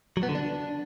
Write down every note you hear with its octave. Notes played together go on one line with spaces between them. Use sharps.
F#3
B3
D3
D4